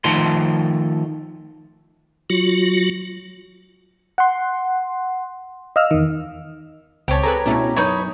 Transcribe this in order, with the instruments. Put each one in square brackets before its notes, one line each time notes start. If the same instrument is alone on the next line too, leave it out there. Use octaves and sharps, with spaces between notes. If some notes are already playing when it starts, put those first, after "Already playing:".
[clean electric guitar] D#3 F3 A3 C6
[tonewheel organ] F#3 F4 F#4
[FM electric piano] F#5 C6
D#5 F5 E6 F6
E2 D#3
[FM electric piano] C#2 A5 [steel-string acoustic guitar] C4 [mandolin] G4 C#5
[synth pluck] G#4 A4 B4 [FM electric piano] A#5
[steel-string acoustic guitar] B2 E4 [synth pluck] A3 C#4 D4
[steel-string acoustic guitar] F#2 [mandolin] D#4 B4 C#5